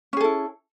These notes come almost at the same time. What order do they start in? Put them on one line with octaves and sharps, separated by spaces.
C#4 G#4 A4 E4